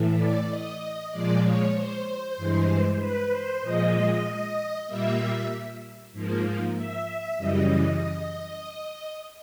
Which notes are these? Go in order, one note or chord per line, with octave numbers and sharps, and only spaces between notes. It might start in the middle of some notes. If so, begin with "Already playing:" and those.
Already playing: A2 E3 A3
D5
D#5
A#2 F3 G#3 D5
C#5
C5
G2 E3 G#3
B4
C5
A#2 F3 G#3 D#5
A#2 G3 A#3 E5
G#2 F3 A#3
E5
E5
F#2 C#3 E3 G3 D#5